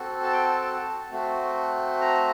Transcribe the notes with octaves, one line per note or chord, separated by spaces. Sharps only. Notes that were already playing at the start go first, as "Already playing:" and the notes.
Already playing: C4 F#4 A4
A5
G5
A5
A3 C4 F#4
A#5